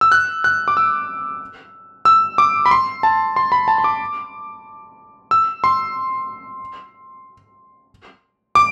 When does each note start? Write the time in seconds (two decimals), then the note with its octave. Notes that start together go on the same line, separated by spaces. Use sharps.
0.01 E6
0.12 F#6
0.44 F#6
0.68 D6
0.77 E6
2.05 E6
2.38 D6
2.66 B5
2.71 C6
3.03 A5
3.36 C6
3.52 B5
3.68 A5
3.78 C6
3.84 D6
5.31 E6
5.64 C6
8.55 D6